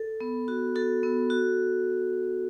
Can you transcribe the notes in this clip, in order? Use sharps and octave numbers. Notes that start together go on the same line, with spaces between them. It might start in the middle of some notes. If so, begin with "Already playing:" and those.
Already playing: A4
B3
F#4
F#4 A4
B3
F#4